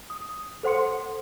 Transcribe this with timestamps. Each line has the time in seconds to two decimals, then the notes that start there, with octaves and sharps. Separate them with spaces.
0.10 D#6
0.63 A4 C5 F#5 C6 C#7